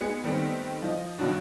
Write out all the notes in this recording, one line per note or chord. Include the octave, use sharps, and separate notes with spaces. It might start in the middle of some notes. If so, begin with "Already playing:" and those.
G#3 B3 G#4 C#7
D#3 G3 A3 B3 C4
F3 D#5
G2 B2 D#3 F#3 D4 F#4